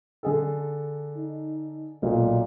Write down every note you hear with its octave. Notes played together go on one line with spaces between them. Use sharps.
D3 G#4 A4
D#4
B1 A#2